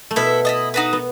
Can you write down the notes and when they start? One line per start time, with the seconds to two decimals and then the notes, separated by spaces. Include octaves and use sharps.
0.11 A3
0.16 B2 B3 E4 A4 E5
0.45 E4 A4 D#5
0.74 D#4 F#4 B4
0.93 B3